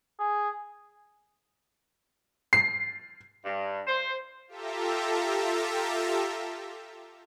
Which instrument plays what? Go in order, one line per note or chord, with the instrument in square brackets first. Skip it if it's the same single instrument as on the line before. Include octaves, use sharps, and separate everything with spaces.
[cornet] G#4
[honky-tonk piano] C7
[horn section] G2
C5
[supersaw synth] F4 G4 A4 E5 A#5